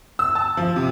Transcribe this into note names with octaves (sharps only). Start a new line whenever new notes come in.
E6
A5
F3
C3